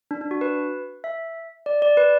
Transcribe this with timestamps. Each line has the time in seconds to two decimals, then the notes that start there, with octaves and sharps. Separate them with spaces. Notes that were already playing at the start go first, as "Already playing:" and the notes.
0.11 D4
0.21 D4
0.31 F#4
0.41 B4
1.04 E5
1.66 D5
1.82 D5
1.97 B4